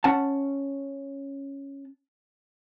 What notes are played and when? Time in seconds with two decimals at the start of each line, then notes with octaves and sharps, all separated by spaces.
0.04 C#4 F#5 A5